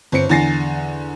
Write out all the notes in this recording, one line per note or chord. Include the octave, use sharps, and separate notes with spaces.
G1 C4 C#7
E2 D3 G#5 A6 A#6 C7